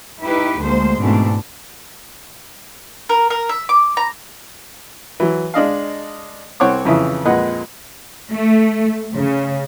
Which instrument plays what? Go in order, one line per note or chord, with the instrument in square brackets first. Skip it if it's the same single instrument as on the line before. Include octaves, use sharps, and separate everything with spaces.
[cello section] D#4 E4 G4 B4
D2 G#3 A#3 C5
G#2 B2 E3 A3 C4 D4
[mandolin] A#4
A#4
E5
D6
A#5
[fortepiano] E3 F#3
G#3 D4 D#5 F5
C2 C4 C#5 F#5 D6
F2 C#3 E3 E4
F2 A#2 G#3 B4 D#5 F#5
[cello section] A3
C#3